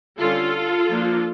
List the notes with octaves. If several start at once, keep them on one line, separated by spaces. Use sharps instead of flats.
D3 G3 C#4 F4 A4
F3 A#3 D4